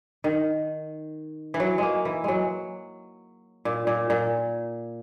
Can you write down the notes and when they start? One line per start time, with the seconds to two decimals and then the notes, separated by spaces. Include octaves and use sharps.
0.24 D#3
1.54 E3
1.60 F#3
1.78 G#3 A#3
2.05 E3
2.24 F#3 G#3
3.65 A#2
3.87 A#2
4.10 A#2